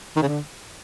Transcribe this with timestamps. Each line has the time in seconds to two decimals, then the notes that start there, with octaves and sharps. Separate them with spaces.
0.16 D#3
0.22 C#3
0.28 D3